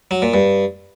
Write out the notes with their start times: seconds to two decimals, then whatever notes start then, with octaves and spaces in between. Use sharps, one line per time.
0.11 F#3
0.22 A#2
0.34 G2